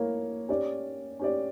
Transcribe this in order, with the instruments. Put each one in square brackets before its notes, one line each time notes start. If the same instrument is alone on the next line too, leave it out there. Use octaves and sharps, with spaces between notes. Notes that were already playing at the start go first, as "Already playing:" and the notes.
Already playing: [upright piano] A#3 E4 A#4 C#5 F5
C#4 G4 D5
C#4 G4 D5